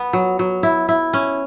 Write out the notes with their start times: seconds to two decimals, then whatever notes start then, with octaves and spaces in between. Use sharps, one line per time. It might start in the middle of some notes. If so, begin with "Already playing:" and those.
Already playing: B3
0.13 F#3
0.39 F#3
0.63 E4
0.89 E4
1.13 C#4